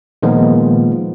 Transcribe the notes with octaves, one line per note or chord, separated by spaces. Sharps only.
A#2 D#3 F3 G#3 A#3 B3